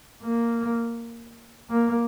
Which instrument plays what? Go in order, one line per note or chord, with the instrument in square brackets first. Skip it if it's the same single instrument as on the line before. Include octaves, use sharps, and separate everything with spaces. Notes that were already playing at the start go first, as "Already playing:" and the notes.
[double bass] A#3
A#3